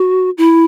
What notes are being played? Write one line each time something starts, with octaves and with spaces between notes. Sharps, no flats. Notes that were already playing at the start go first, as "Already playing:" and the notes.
Already playing: F#4
E4